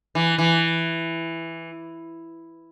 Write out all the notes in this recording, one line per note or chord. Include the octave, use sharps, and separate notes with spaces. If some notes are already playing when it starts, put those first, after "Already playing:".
E3
E3